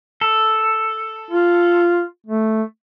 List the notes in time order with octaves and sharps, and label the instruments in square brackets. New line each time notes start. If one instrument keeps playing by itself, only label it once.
[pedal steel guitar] A4
[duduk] F4
A3